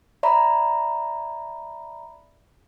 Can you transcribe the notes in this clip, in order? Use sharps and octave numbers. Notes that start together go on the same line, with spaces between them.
D5 E5 A#5 B5